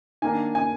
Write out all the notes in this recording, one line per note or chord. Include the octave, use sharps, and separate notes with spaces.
D#3 A#3 D4 G#5
G#5